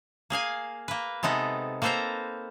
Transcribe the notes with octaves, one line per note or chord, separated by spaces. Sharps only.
A#3 G#4 F5 G#5
A#3 B4
C3 G#3 B3 D#4 A4
A#3 C4 A4 B4 C5 A#5